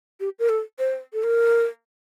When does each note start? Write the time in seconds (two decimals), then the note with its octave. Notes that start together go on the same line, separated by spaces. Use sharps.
0.20 G4
0.39 A#4
0.49 A4
0.79 C5
1.13 A4
1.23 A#4